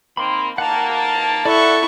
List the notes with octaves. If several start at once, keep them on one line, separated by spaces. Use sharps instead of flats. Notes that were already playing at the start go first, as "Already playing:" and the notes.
D#3 A#3 C4 B5 C6
D#3 A#3 F#5 A5 A#5
A5
E4 A4 D5 F#5 C#6